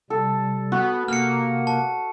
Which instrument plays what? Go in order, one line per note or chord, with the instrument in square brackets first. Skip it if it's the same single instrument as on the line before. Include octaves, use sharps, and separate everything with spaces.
[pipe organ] C3 G3 [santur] A4
[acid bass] B3 [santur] F#4
[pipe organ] C3 [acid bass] A#3 [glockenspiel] F6 C#7
[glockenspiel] A5